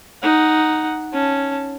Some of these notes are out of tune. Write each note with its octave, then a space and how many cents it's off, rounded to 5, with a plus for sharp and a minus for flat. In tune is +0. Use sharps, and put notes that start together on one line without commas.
D#4 +0 F#5 +0
C#4 +0 A5 -5